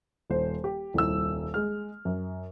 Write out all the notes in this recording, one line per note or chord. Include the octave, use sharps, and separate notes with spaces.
D#1 C5
G4
D#1 C2 E6
G#3 F6
F#2